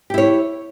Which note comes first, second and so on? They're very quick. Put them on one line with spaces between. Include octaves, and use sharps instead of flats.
G4 E4 C#5